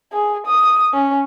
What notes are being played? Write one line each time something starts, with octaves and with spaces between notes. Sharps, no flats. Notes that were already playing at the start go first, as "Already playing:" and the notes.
G#4
D#6
C#4